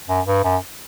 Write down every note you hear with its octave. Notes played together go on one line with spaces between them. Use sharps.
F#2
G2
F#2